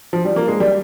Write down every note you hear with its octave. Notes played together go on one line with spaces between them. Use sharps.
F3
G3
A#3
G#3
G3